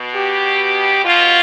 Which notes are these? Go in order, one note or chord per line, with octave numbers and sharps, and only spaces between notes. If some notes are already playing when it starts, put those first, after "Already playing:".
Already playing: B2
G4
B2 F4